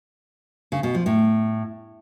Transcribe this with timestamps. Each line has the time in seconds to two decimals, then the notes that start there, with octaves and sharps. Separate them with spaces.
0.72 C#3
0.83 B2
0.95 F3
1.06 A2